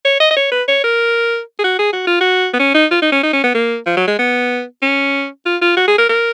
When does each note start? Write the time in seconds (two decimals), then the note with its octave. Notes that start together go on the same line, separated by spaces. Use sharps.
0.05 C#5
0.20 D#5
0.31 D#5
0.37 C#5
0.52 B4
0.68 C#5
0.84 A#4
1.59 G#4
1.64 F#4
1.79 G#4
1.93 F#4
2.07 F4
2.21 F#4
2.53 B3
2.59 C#4
2.74 D#4
2.91 F4
3.02 D#4
3.12 C#4
3.23 D#4
3.33 C#4
3.44 B3
3.55 A#3
3.86 F3
3.97 F#3
4.07 G#3
4.19 B3
4.82 C#4
5.46 F4
5.62 F4
5.77 F#4
5.88 G#4
5.98 A#4
6.09 A#4